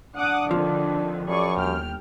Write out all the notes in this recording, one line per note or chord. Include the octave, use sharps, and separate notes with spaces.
D4 F#5 D6 D#6
F2 D3 D#3 F3
F#2 G#4 D5 C#6
G1 D#2 G5 F6